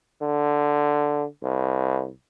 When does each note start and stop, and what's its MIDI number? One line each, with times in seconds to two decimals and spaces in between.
0.22 1.25 50
1.43 2.09 36